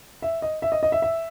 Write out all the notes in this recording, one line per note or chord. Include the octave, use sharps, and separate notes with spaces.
E5
D#5
E5
D#5
D#5
E5
E5